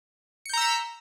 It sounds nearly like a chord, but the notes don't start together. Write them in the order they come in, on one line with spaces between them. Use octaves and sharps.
C#7 G6 A#5 E6 B6